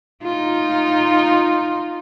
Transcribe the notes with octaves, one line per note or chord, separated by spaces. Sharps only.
D#4 F4